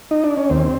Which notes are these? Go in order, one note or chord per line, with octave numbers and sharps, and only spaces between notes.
D#4
D4
C#4
D#2 C4